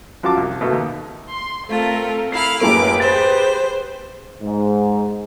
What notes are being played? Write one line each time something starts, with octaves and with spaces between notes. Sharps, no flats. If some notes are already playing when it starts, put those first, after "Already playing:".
F#2 F3 F4 F#4 A5 D6
C2
B2 A3 A#3
D#2
C6
A3 C4 F4 A4 A#4
E4 F5 F6 C7
F#2 A2 A#3 G4 G#4 B4 D6
C5 A6
G#2